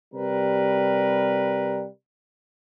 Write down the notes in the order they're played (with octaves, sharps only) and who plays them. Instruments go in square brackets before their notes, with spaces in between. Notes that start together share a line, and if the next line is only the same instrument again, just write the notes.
[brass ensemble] C3 G3 A#4 B4